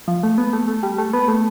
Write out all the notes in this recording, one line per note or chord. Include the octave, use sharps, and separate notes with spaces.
F3
A3
B3
A3
A3
G3
A3
B3
A3